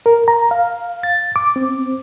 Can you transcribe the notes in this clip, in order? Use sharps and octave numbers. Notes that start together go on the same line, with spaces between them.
A#4
A#5
F5
A6
D6
C4